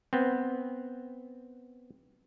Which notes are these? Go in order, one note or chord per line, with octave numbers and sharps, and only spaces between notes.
B3 C4